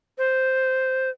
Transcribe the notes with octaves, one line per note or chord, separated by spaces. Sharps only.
C5